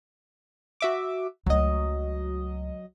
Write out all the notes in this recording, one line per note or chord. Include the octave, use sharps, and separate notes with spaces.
F#4 E5 D6
C#2 F#3 A3 D#5